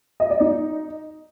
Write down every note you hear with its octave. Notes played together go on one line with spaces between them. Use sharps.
D#5
D5
D#4